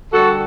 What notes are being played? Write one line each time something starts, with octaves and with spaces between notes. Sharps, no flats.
D3 G3 F#4 A4